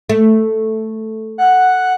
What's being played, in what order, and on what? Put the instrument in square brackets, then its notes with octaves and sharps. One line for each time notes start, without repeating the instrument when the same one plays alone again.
[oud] A3
[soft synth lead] F#5